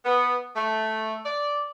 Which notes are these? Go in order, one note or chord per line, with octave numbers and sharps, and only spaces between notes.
B3
A3
D5